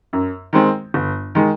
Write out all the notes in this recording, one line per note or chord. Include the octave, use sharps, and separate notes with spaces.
F#2
D#3 G#3 C4
G1
D#3 G#3